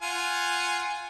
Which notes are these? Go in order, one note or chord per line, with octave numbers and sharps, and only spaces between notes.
F4 F#5 G#5